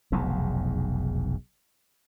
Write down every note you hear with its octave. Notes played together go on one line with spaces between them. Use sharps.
F1 B1 E2 G#2